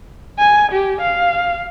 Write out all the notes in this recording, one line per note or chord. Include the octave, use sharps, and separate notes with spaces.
G#5
G4
F5